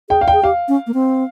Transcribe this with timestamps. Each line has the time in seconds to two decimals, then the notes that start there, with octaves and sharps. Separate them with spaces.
0.09 G#4 G5
0.21 F5
0.28 G5
0.33 G#4
0.43 G4 F5
0.68 C#4
0.87 A#3
0.94 C4